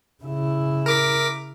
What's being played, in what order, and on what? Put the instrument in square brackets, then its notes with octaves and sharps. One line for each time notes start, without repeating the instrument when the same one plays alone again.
[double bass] C#3 E4
[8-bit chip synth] A#4 D6 B6